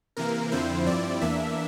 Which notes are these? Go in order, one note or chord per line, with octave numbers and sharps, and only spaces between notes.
C3 E3 A#3 A#4
F2 D3 F3 C4 E4 C5
G2 F3 C4 E4 D5
E2 E3 A#3 D4 E5